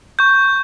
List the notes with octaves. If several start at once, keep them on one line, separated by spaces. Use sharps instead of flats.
C#6 G6